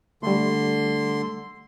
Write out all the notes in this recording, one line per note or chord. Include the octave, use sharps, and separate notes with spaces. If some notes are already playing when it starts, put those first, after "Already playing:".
D3 G3 A3 C6